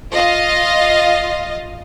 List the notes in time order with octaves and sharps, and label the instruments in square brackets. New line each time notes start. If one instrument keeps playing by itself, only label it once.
[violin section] F4 D#5 F5